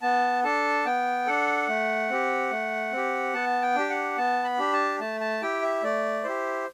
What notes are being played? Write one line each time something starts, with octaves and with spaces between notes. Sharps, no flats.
B3 A5
D4 A4 A5
B3 G5
D4 A4 F#5
A3
C4 G4
A3
C4 G4
B3 A5
G5
D4 G4
F#5
B3 A5
B5
D4 G4
A5
A3 A5
A5
E4 G4 G5
E5
A3 D5
E4 G4 C5